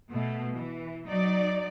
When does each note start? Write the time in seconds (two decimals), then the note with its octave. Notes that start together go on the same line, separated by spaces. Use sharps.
0.12 B2 A3
0.56 E3
1.07 F#3 D#4 D5